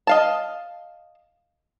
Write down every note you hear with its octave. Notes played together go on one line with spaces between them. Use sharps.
D#5 F5 A5